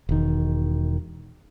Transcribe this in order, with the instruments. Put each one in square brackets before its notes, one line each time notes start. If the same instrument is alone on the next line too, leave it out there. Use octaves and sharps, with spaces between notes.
[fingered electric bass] E1 D#3